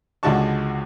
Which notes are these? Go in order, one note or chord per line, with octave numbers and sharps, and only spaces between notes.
C#2 D3 G#3 F#4 A5 C#6